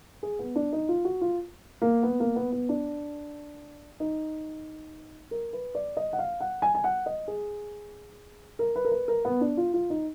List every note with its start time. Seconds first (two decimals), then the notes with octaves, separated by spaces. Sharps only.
0.23 G#4
0.39 B3
0.56 D4
0.73 D#4
0.89 F4
1.05 F#4
1.21 F4
1.82 A#3
2.03 B3
2.20 A#3
2.36 B3
2.52 B3
2.69 D4
4.00 D#4
5.31 A#4
5.53 B4
5.75 D5
5.97 D#5
6.13 F#5
6.19 F5
6.40 F#5
6.62 G#5
6.75 G#5
6.84 F#5
7.06 D#5
7.28 G#4
8.59 A#4
8.76 B4
8.85 A#4
8.92 B4
9.08 A#4
9.25 B3
9.41 D4
9.57 F4
9.74 F4
9.90 D#4